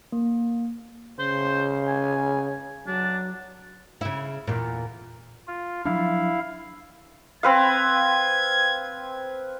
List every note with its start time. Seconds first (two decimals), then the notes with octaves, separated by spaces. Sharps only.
0.12 A#3
1.19 C#3 C5
1.87 G#5
2.87 F#3 D4
4.01 C#3 E4
4.47 E2 A#2
5.48 F4
5.85 F3 F#3 D4 E4 F5
7.43 C4 B4 F5 G#6